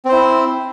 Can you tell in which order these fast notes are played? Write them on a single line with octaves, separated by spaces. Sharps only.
C4 C5 E4